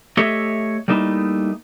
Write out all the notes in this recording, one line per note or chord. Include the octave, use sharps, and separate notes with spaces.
A3 G4 A4 C#5 D#5 E5
G3 A3 A#3 D#4 E4